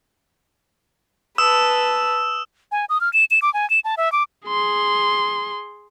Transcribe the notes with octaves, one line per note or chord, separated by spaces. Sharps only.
B4 A5 D#6 E6 E7
G#5
D#6
F6
E7
E7
D6
G#5
E7
A5
E5
D6
G#4 C6